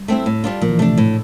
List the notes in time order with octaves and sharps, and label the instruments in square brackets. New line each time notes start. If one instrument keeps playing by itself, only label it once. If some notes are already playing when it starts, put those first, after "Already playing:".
Already playing: [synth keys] G3
[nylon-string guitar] A3 C4 E4
A2
G3 D4 F4
[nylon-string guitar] A#2 [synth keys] F3
[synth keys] E3
[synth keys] C3 [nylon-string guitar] A3 D4
[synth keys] A#2
[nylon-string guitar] A2